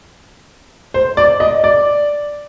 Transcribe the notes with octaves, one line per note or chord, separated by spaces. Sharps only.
C5
D5
D#5
D5